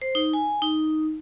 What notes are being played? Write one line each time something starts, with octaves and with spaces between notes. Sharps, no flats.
C5
D#4
G#5
D#4